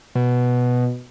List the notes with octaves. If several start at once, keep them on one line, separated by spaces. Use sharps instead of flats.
B2